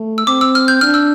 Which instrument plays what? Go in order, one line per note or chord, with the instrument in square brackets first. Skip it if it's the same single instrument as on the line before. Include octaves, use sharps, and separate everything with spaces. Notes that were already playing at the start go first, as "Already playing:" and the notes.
Already playing: [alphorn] A3
[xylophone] E6
[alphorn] C4 [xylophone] D6
[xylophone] E6
F6
G6
[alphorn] D4 [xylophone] F6
[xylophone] E6